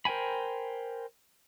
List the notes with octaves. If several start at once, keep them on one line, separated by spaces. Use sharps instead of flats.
A#4 C5 G5 G#5 B5